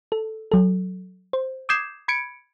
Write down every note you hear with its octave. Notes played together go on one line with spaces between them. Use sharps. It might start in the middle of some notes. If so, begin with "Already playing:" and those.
A4
F#3 A4
C5
D6 D#6 G6 G#6 C7 E7
B5 G#6 C#7 D7